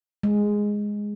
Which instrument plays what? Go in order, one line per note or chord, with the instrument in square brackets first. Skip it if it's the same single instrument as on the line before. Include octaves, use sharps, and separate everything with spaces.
[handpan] G#3